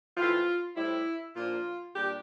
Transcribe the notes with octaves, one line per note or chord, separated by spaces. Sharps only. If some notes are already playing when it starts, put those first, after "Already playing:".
A2 E3 A3 C4 F4
A2 G3 C4 E4
A#2 F3 A#3 D4 F4
A#2 G3 D4 G4